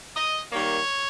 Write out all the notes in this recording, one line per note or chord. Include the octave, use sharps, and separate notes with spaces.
D#5
D#3 G3 A#3 C#5